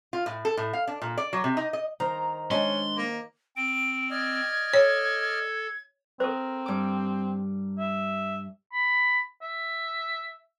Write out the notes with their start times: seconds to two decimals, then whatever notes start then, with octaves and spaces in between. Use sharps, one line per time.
0.13 F4
0.26 A2
0.45 A4
0.57 A2
0.73 F5
0.87 D4
1.02 A#2
1.18 D5
1.33 F#3
1.44 C3
1.57 D#4
1.73 D#5
2.00 D#3 C5 A#5
2.51 G#3 C#4 D4 C6
2.98 A#3
3.56 C4 D7
4.11 D5 D#5 F6 G#6
4.74 A4 C#5
6.20 C4 A4 A#4 C5
6.66 G2 D6
7.79 E5
8.72 B5
9.41 E5